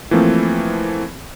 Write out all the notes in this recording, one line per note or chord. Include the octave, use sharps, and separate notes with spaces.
E3 F3 A3 A#3 C4